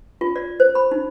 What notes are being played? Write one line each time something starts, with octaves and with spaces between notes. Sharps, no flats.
F4
D5
C5
B5
D#4